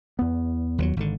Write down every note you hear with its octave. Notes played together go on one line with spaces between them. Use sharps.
E2 B3
D#2 F3 F#3
G#1 D3